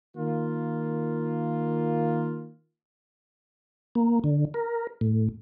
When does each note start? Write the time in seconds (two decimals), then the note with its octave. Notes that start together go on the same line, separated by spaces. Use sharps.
0.17 D#3 A#3 F4
3.95 A#3
4.24 D3
4.54 A#4
5.01 A2